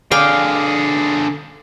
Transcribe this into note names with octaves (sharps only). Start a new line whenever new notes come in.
D3 G#4 D5 F5 G5